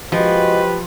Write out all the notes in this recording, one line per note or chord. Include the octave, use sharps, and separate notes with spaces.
F3 G#3 F#4 G4 B4 D#5